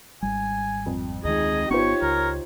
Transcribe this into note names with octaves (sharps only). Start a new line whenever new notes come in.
G#1 G3 G#5
F2
D2 D#3 G#3 D#4 G#4 D#5
G1 B3 D#4 F4 G4 C5 C#5 C#6
C#2 A#4